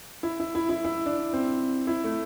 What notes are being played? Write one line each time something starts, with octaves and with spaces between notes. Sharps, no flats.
E4
E4
E4
E4
E4
D4
C4
E4
A3